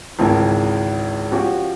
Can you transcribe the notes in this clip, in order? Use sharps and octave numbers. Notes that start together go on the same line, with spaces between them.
G#1 C#2 E3 C4 A#4 G#5
F3 C#4 F#4 G4